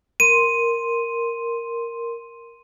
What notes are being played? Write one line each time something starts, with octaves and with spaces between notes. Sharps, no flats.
A#4 C6 D#7